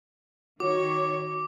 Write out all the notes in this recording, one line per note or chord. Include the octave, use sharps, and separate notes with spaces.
D#3 F#4 C#5 D6